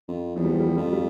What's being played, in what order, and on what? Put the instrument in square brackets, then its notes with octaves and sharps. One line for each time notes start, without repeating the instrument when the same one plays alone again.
[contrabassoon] F2
[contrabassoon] E2 [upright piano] F3
[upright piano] G3
F3
G3
F3
[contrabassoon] F2 [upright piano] G3
[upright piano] F3
G3